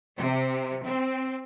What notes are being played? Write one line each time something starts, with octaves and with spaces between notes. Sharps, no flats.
C3
C4